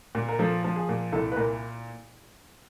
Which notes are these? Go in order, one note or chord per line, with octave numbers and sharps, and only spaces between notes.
A#2
A#4
F3 A4
F3
G#4
A#2
C2 A4
B4
A#2 A#3 A#4